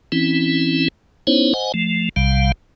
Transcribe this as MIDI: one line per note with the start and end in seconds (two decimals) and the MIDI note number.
0.12 0.88 52
0.12 0.88 60
0.12 0.88 61
0.12 0.88 64
1.27 1.53 59
1.27 1.53 61
1.27 1.53 63
1.27 1.53 64
1.27 1.53 72
1.27 1.53 73
1.54 1.72 72
1.54 1.72 75
1.54 1.72 78
1.54 1.72 80
1.74 2.09 53
1.74 2.09 57
2.16 2.52 35
2.16 2.52 48
2.16 2.52 55
2.16 2.52 77